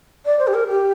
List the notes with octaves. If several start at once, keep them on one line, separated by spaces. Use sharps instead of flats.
D5
C5
G4
A#4
G4